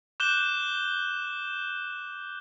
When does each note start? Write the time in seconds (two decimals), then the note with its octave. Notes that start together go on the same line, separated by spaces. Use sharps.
0.20 D6 F#6 G6 E7 G7